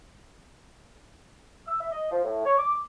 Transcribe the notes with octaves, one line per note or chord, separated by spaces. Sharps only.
E6
E5
D#5
F3
A2
C#5
D6